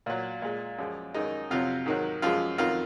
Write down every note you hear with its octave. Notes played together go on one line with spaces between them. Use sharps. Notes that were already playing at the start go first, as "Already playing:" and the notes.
A#2 F#3
A#2 G#3
F#2 F3 G#3
F#2 D#3 G#3 D#4
F2 C3 F#3 F4
G#2 D#3 F#3
F#2 F3 G#3 F4
F2 D#3 F#3 F4